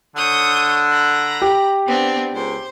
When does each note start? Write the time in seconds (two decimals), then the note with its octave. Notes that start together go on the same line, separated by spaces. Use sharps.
0.15 D3 C#5 D#6 G6
0.91 A#5 B5
1.42 G4
1.85 B3 C4 D4
2.34 C#2 C5